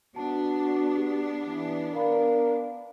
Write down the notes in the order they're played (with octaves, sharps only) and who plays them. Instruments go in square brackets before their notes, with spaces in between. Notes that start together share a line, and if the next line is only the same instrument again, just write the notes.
[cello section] B3 D4 [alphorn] F#4 [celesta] A5
[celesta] G4
[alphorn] E3
[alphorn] A#4 [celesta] D5 F5 B5